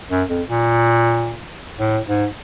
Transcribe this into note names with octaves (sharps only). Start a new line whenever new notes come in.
F#2
F2
A#2
A2
G#2